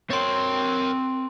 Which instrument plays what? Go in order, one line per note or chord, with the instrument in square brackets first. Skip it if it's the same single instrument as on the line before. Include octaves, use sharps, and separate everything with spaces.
[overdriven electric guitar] C4 G5 [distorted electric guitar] A#4 C#5 [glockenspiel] C6 A6